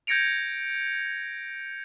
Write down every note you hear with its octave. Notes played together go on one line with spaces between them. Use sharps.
G6 G#6 A#6 C#7 D7 F7